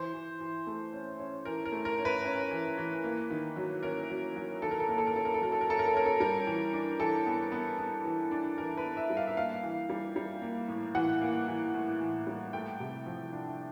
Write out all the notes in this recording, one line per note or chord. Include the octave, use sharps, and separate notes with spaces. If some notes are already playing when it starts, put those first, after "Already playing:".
Already playing: E3 C5
E3
E3
A3
C#4
C#4
E3 A#4
A#4
A3
A#4
C#4
B4
C#4
E3
E3
A#3
D#3
F#3
C#4 A#4
F#3
F#3
D#3 A4
A#4
A4
A#3 A#4
A4
A#4
C#4 A4
A#4
A4
F#3 A#4
A4
A#4
C#4 A4
A#4
A4
C#4 A#4
A4
G3 A#4
E3
D4
E3 A4
B3
B3
B3
E3
D4
E3 A#4
B4
B3
E5
G3
F5
E5
A#3 F5
E3
G3
G3
A#3
A2
E3 F#5
A#3
E3
A2
E3
G3
A3 G5
C3
F3
D4